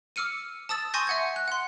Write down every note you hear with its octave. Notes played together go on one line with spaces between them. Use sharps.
D6 E6 F6 C#7 D#7
A5 D#6 E6 A6
G#5 C6 C#6 D#6 G6 A#6
E5 F#5 G#6
F#6
F#5 C6